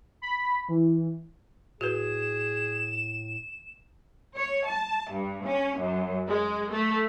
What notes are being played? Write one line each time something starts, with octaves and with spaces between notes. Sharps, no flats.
B5
E3
A2 F#4 G#4 B4 E7
C#5
A5
G2
C#4
F#2
G#3
A3